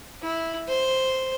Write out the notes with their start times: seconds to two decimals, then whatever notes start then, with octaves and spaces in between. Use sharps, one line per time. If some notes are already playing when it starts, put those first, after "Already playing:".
0.22 E4
0.68 C5